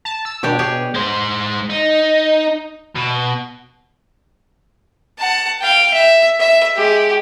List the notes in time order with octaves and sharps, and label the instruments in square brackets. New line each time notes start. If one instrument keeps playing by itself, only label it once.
[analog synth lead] A5
E6
[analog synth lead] B2 [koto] D4 G4 C#5
[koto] G4 G#4 C#5
[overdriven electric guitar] G#3 C5
D#4
B2
[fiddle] F#5 A5
F5 G5
E5
E5
G#3 G4